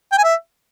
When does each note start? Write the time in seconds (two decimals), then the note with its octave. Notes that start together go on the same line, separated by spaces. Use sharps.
0.12 G5
0.18 G#5
0.24 E5